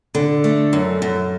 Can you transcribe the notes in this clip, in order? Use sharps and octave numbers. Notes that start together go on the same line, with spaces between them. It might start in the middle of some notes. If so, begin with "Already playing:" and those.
D3
A3
F#2
F#2